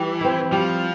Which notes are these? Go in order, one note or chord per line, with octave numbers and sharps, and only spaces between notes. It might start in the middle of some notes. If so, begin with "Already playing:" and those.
Already playing: E3 G3
C4 E4
F3 G3